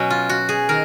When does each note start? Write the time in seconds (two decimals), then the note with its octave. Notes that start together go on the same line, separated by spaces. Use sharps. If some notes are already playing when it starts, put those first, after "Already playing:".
Already playing: B2 F#3 C#4
0.10 F4
0.29 F#4
0.49 G#4
0.69 D#3 A#4